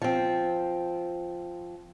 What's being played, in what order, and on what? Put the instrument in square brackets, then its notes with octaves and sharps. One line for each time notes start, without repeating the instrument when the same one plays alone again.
[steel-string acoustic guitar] F3 C4